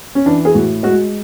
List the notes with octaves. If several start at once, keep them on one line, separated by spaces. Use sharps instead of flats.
C#4
E3 D4
G#4
A2 F#4
G#3 F#4